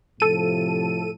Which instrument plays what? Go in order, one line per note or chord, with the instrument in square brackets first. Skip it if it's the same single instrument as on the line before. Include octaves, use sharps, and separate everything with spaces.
[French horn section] A2 C3 F3 [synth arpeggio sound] A4 D#7